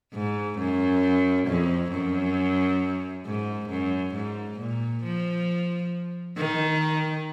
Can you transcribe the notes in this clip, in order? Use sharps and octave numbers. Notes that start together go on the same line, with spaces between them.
G#2
F#2
F2
F#2
G#2
F#2
G#2
A#2
F3
D#3